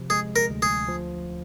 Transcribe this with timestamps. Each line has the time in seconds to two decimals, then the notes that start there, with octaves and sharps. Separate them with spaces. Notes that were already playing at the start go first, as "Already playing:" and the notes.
Already playing: C3 F3
0.10 G#3 G#4
0.36 A#4
0.49 D2
0.62 G#4
0.88 F3